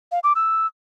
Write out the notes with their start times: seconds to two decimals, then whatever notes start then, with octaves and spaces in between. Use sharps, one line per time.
0.12 F5
0.24 D6
0.35 E6